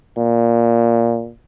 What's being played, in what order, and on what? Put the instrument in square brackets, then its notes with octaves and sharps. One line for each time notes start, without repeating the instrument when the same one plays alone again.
[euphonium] A#2